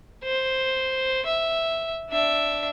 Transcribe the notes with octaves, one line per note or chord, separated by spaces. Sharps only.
C5
E5
D4 E5